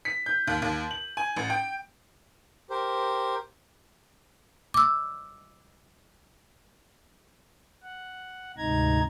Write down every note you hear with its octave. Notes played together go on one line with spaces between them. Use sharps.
B6
G6
D#2
D#2
F#7
G#5
A1
G5
G4 A#4 C5
D6 E6
F#5
D2 G#2 C3 D#4 A#5 G#6